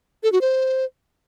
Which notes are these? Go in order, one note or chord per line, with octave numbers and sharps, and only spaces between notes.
A4
F#4
C5